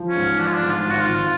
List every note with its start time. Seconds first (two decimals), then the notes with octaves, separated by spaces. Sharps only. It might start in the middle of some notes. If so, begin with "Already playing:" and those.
Already playing: F3
0.09 C#4
0.16 G#2
0.39 F3 D4
0.47 F4
0.54 D4
0.63 G#2
0.70 F4
0.85 G#1 F#4
1.00 F4
1.08 G#1